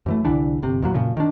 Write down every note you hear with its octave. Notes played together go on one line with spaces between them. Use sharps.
F#2 E3 A3
C2 D3 E3 D4
G1 C3
E2 A#2 F#3
F#2 A#2 C#3 F3
D#3 D4